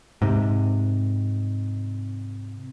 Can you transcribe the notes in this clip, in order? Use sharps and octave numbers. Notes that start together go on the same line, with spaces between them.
G#2 C3